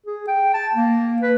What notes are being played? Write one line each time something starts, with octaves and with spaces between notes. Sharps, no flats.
G#4
G5
A5
A#3
B4